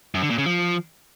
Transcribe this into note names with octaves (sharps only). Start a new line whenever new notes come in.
F#2
D3
A#2
C#3
F3